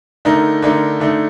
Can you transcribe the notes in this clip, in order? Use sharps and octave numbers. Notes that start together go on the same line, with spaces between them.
D3 A3 D#4 A#4
D3 A3 D#4 A#4
D3 A3 D#4